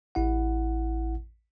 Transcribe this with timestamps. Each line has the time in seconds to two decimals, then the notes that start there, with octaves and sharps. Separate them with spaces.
0.15 A1 E4 F#5